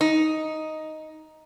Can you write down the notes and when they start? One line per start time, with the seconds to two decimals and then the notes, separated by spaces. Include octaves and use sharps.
0.01 D#4